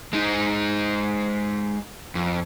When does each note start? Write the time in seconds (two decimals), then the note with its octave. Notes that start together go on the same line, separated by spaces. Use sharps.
0.13 G#3 D#4
2.15 F2